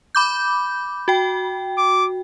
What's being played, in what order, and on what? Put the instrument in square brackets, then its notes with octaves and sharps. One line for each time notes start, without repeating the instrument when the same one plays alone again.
[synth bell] B5 D6 G6
F#4 G5
[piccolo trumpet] D6